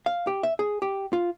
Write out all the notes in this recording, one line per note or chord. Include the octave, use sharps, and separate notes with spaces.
F5
G4
E5
G#4
G4
F4